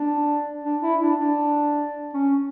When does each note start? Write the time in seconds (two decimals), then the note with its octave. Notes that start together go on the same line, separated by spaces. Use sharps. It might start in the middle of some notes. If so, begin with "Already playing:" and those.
Already playing: D4
0.64 D4
0.82 E4
1.01 D4
1.20 D4
2.14 C#4